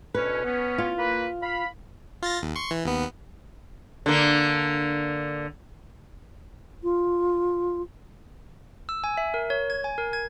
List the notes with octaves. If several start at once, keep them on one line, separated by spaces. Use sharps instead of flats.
D2 B2 C#4 B4
B3 C#4
F4
A#3 B4
F5 B5
F4 A6 A#6
D#2
C6 C#6
E3
D#2 B3
D3 A#3
F4
E6
G#5
E5
A#4
C#5
G#6
G#5
A#4
G#6